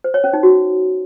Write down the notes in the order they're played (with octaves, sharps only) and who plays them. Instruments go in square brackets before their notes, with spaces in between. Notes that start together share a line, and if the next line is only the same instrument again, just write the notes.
[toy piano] C5
C#5
C#4
D#4
F#4